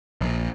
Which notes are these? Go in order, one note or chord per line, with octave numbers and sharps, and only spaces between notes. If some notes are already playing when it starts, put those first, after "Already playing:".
A#1